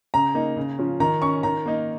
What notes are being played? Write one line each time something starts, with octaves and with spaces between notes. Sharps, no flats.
C#3 A#5
A#3 D#4
C#3
F3 C#4
D#3 A#5
C#4 C#6
D#3 A#5
A#3 D#4